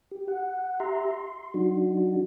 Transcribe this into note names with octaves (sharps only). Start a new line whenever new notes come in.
G4
F#5
G4 E5 A#5 C6
C6
F#3 D4 D#4 F#4